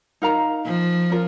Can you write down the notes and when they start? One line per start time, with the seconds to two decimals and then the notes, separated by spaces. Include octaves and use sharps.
0.22 D#4 A#4 F5 A#5
0.66 F3
1.10 C#4 F4 A#4